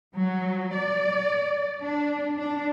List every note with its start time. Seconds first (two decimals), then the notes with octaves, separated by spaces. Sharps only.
0.15 F#3
0.73 D5
1.81 D4
2.37 D4